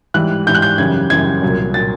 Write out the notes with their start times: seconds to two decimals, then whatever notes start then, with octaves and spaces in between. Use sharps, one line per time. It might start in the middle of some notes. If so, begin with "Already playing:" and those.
0.14 G#2 E3 G3 F#6
0.46 G#2 E3 G3 G6
0.55 F#6
0.62 G6
0.78 F#2 C#3 E3 G3 G#6
1.10 F#2 C#3 E3 G3 G#6
1.42 C2 A#2 F#3
1.74 A#2 F#3 A6